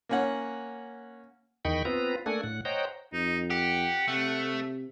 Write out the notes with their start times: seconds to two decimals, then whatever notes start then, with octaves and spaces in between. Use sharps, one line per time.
0.09 A#3 C#4 F#5
1.65 E2 D#3 D#5 G5 B5 C#6
1.85 B3 C4 F4 B4 A#5
2.26 A3 A#3 D4 A4 F#5 G#5
2.44 A2 F#5
2.65 C5 C#5 D#5 F#5 G5 A#5
3.13 F2 D#4
3.50 G4 F#5
4.08 C3 A3